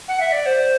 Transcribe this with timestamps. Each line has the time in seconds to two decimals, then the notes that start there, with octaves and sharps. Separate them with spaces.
0.08 F#5
0.20 E5
0.32 D5
0.46 C5